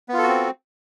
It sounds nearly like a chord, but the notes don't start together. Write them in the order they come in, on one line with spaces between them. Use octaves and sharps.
B3 F4 A4 F#4 C4